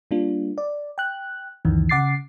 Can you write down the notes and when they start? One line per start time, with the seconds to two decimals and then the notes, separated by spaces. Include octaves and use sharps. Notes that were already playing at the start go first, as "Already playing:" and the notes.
0.11 G3 A#3 D4 F4
0.58 D5
0.98 G5 F#6
1.65 C#2 F#2 D#3 E3
1.89 C#3 F#5 D6 A6 C7